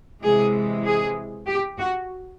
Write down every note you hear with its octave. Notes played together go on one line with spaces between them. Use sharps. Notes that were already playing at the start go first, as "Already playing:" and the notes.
C3 E3 G#3 G#4
G#4
G4
F#4